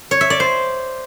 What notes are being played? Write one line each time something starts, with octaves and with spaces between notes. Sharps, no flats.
C#5
E5
D5
C5